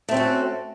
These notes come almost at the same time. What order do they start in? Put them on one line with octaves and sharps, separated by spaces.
A3 C4 C#4 F#4